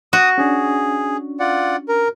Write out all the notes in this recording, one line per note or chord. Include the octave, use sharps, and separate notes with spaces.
F#4 D#6
C#4 D4 G#4
F4 D5 F#5
A#4